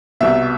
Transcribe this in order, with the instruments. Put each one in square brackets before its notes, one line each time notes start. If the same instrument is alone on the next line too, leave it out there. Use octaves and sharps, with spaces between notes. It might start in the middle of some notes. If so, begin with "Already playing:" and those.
[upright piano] C2 B2 E5